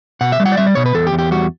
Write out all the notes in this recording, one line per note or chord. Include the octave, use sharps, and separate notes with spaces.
B2 F#5
E5
G3
F#5
D5
G3 E5
D5
B2 C#5
B4
E2 A4
G4
E2
G4
G3 F#4